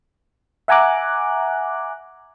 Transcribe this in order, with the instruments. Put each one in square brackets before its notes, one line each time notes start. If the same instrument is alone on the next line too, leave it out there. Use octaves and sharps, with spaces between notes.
[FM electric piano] E5 F#5 G#5 A#5 D6 F#6